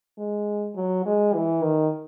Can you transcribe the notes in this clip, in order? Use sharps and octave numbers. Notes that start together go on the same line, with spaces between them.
G#3
F#3
G#3
E3
D#3